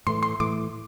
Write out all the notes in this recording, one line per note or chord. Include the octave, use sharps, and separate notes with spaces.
A2 E3 A3 C6
C6
A2 E3 A3 D6